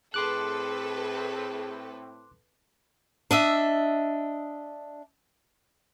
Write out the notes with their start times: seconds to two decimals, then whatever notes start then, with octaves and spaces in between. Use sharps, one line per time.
0.14 A2 C4 G#4 A4 B4 C6 D6 F#6
3.31 D4 D#5 E5